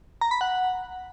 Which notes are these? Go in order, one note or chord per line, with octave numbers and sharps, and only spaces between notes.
A#5
B5
F#5